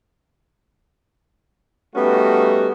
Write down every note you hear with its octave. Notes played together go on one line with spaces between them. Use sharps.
G3 A3 B3 C#4 D#4 F#4